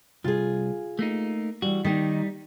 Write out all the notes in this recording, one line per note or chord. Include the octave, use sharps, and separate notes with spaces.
C2 F4 G#4
A3 A#3 D#4
E3 G3 F#4
D#3 G3 A#3 D#4